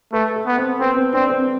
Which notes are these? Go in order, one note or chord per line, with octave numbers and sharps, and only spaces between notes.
A3 B4
A4
B3
C4
B3 C4
C4
C4 D4
C4